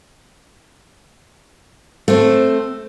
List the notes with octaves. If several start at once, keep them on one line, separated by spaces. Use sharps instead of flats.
A3 C4